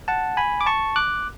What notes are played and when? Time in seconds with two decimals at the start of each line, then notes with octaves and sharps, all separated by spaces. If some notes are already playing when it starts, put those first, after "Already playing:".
0.08 F#5 A5
0.37 G#5 B5
0.61 D6
0.66 A5 C#6
0.96 D6 F#6